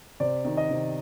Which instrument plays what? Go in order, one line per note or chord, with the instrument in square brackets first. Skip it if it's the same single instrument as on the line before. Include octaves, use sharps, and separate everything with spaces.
[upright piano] C3 D5
D#3
D#5
C3